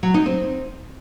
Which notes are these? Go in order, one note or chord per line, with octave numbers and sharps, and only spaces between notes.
F#3
D#4
C4